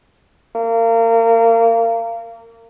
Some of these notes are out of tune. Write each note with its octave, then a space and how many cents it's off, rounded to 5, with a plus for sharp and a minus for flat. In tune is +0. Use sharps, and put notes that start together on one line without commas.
A#3 -30